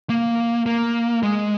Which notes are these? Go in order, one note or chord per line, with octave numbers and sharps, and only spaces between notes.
A#3
A#3
G#3